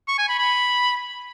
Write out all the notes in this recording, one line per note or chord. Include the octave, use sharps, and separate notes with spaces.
C#6
G#5
B5
B5